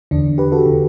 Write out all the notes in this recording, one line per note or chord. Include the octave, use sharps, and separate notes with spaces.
E2 D3 D4
G4 B4
F#4 A4
D3